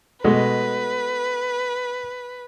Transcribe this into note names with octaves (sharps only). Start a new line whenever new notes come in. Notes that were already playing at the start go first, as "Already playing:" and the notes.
B2 G#3 A3 B4